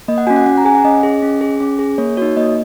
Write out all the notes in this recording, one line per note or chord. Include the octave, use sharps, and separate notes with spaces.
A#3 D#5
F#5
C#4 F#4 G#5
F#5
C#4 F#5
A#5
G#4 G#5
F#5
C#4 D#5
G#4
C#4
G#4
C#4
G#4
A#3 C#5
D#4 F#4 C#5
A#3 D#5